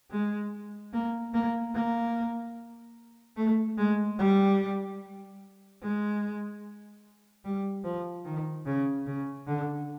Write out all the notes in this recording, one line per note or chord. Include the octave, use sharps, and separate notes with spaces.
G#3
A#3
A#3
A#3
A3
G#3
G3
G#3
G3
F3
D#3
C#3
C#3
D3